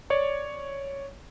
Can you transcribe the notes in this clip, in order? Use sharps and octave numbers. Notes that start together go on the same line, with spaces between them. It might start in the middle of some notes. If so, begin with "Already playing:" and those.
C#5 D5 C#6